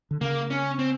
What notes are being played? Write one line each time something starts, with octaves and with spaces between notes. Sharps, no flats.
D3
C#3 A#3
C#4
C4